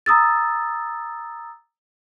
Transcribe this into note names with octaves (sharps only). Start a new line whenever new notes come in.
A#5 D#6 E6 A6